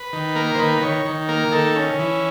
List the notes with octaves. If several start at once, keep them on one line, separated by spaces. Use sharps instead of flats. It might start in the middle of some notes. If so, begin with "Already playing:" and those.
Already playing: B4
D#3
A#3 A#4
C5
D#3 B4
D#3 C#5
D#3
A#3 A#4
D#3 A4
C#4
E3